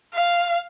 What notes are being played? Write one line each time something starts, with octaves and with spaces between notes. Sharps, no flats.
F5